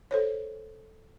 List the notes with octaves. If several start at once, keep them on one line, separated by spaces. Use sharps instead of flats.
A4 C5 C#5